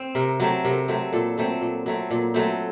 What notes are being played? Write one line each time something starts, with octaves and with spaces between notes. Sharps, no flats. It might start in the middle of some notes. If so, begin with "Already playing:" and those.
Already playing: C4
C3 A#4
F#3 A3 C4
C3 A#4
F#3 A3 C4
A#2 A4
F#3 A3 C4
A#2
F#3 A3 C4
A#2
F#3 A3 C4